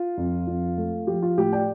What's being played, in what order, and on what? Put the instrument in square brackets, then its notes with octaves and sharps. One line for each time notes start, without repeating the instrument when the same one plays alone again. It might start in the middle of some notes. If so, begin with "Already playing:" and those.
Already playing: [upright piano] F4
F2
F2
A3
F3 G4
F4
A2 G4
D5 G5